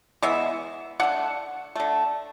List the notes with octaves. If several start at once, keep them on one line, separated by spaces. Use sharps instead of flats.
E3 G#3 B3 E5
D3 A3 F#5
D3 A3